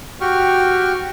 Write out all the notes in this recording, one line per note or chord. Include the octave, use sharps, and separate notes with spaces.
F#4 G4 G5 C#6 F6